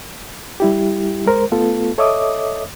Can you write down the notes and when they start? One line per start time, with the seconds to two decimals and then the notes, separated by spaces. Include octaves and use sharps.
0.60 G3 E4 G4
1.26 G#3 A#4 C5
1.52 A3 B3 F4 A4
1.98 A4 C#5 D#5 E5 D6 D#6